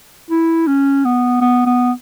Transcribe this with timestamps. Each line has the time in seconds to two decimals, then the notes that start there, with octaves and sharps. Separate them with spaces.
0.31 E4
0.67 C#4
1.05 B3
1.41 B3
1.66 B3